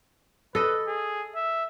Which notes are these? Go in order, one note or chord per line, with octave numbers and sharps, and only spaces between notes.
A4 B4 D#5
G#4
E5